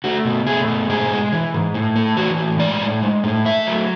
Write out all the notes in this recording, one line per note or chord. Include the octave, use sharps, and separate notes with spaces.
A3 F#4
B2
A3 G#4
B2
G#2 G#4
G#3
E3
G#2
A2
A3
E3 F#4
A2
G#3 D5
A2
G#3
A2
A3 E5
F#3